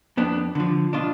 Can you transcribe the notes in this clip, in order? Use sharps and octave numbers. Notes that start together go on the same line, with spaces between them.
F2 B3 D4
D3 F3
B2 D4 F4